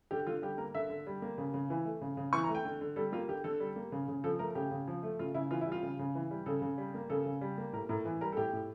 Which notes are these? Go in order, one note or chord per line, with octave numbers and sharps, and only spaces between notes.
D3 G4
D3 F4
G3 G4
A#3 A#4
D3 E5
D3
G3
A#3
C#3
C#3
E3
A3
C#3
C#3
E3 C#6
A#5
A3
G5
D3
D3
G3 A4
A#3 F4
D3 G4
D3 A4
G3
A#3
C#3
C#3
F3 A4
A3 A#4
C#3 G4
C#3
F3
A3
C#3 F4
C#3 E4
E3 F4
E4
G3
F4
C#3
C#3
E3
G3
C#3 A4
C#3
G3
A#3
C#3 A4
C#3
G3
A#3
A2 A#4
A2 A#4
E3
G3 A#4
A4
A2 G4
A2